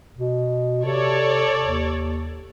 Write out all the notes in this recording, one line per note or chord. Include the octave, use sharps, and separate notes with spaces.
B2
C3 A4 C#5 D5
D#2